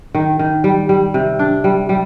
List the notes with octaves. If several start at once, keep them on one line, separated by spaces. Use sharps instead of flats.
D#3
D#3
G3
G3
C3
D4
G3
G3